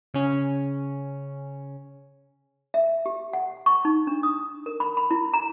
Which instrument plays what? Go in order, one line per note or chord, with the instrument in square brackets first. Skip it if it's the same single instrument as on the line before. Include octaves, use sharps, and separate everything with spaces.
[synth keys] C#3 C#4
[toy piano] E5
G4
F#5
C#6
D#4
D4
D#6
A#4
B5
B5
E4
A#5